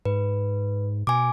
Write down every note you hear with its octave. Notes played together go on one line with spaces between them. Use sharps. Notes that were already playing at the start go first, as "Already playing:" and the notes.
G#2 B4
B2 G#5 D6